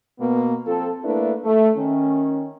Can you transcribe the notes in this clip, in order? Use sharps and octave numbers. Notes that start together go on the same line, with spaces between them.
B2 A#3 B3
F3 C4 F4 A4
A3 A#3 D4 E4 B4
A3
D#3 C#4